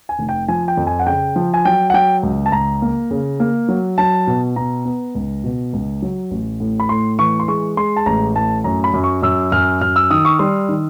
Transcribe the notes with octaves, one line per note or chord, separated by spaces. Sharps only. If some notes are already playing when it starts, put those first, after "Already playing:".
G#5
F1
G5
F3 G#5
G5
F2
G#5
F#5
C#3 G5
F3
G#5
F#3 G5
F#5
F#3 G5
C#2
A5
C#2 A#5
A#3
C#3
A#3
F#3
F#3 A5
B2
B2 A#5
B3
C#2
B2
C#2
F#3
A1
A2
B5
A2 C6
E3 C#6
C6
G#3 C#6
G#3 C6
A5
A1 A#5
A2 A5
F#2 A#5
B5
F#2
C#6
F#2 E6
F#2 F6
F#2 F6
E6
D#3 D#6
C#6
G3 C6
D#3